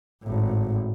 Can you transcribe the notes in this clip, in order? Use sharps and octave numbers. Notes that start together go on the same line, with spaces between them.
G#1 A2